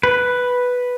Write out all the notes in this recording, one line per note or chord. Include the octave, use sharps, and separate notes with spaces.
B4